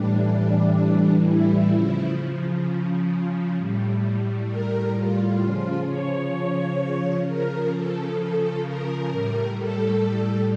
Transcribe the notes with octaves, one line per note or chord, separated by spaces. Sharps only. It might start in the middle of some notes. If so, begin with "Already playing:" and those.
Already playing: A2 E3 G3 D4
E4
C#3 F3
A2 G3
A#4
F4
C#3 F3
C#5
C#3 F3 A#4
A4
A4
A#4
A2 G3
A4